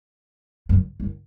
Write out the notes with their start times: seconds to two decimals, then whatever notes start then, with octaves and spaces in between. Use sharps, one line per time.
0.69 F#2
1.00 F#2